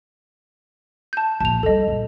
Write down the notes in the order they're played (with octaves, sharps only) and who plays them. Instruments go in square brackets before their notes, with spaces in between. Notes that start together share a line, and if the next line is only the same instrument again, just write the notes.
[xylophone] A5 G6
[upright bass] A#1 F3 [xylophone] A5 F7
[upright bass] G3 A3 [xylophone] A4 D#5
[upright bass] A#1 F#2